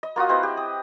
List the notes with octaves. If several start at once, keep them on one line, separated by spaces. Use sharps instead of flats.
D#5
A#3 F4 F#4 D#6
C4 E4 B4 D#5
G4
D#6